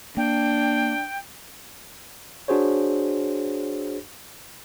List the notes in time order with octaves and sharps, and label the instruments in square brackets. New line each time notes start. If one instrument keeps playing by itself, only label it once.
[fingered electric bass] A#3 [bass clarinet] D4 [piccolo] G5
[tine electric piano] D4 F#4 G#4 C5 C#5